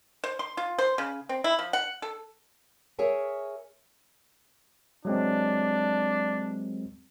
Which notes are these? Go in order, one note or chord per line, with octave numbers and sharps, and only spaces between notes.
C5
C6
F4
C5
C#3
C4
E4
F3
F#5
A4
G#4 A#4 C#5 E5 G#5
F#3 G#3 C4 D4